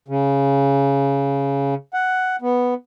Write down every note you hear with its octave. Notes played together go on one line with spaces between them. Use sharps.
C#3
F#5
B3